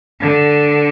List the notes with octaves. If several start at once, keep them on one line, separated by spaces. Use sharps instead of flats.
D3